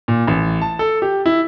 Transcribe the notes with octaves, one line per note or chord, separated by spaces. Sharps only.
A#2
A1
A5
A4
G4
E4